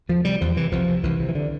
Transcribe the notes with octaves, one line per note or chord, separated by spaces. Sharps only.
E2 F3
C3 G3
E2 F3
C3 E3
C2 F3
C3
C2 E3
C3
E3
D3